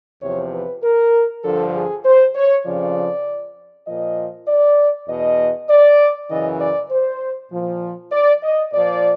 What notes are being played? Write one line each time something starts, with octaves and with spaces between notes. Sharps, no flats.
E2 C3 F3 C#5
B4
A#4
G2 D3 F3 A4
G#4
C5
C#5
F2 C#3 F3 D5
A#2 F3 D#5
D5
E2 B2 D#5
D5
F#2 C#3 E3 D#5
D5
C5
A#2 F3
D5
D#5
A#2 F3 D5